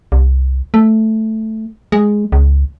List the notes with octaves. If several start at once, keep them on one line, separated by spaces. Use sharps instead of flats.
C2
A3
G#3
C#2